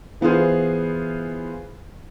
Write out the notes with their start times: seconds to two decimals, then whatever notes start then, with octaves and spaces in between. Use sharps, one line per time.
0.21 E3 B3 F4 G#4 C5